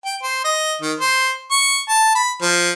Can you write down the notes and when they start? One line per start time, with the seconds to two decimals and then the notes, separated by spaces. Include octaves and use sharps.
0.06 G5
0.23 C5
0.45 D#5
0.82 D#3
1.00 C5
1.51 C#6
1.89 A5
2.15 B5
2.42 F3